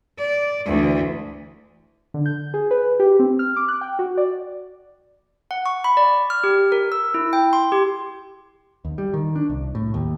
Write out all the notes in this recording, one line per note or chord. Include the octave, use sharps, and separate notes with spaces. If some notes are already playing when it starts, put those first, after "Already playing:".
D5
D2 E3
D3
G6
G#4
B4
G4
C4
F6
D6
F#6
G5
F#4
D5
F#5
C#6
B5
D5
F6
G4
A#4
E6
E4
G5
C6
G4
D#2
G3
D#3
D4
C2
A2
D#2